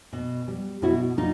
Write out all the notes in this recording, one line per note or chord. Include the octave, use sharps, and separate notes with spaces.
B2
G3
B2 E4 F#4
G3 D#4 F4